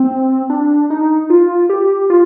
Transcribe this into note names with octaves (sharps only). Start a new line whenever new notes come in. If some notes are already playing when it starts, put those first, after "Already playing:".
Already playing: C4
D4
D#4
F4
G4
F4